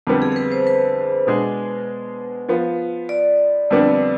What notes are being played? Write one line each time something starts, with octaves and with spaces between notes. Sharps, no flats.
F2 D3 G3 B3
G#4
G#4
B4
C5
B4
B2 G#3 D4 G#4
F3 B3 F4
D5
F2 D3 G3 B3 D4